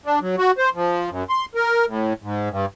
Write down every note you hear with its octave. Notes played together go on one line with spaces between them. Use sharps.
D4
F#3
F#4
C5
F3
F#2
C6
A#4
A2
G#2
G2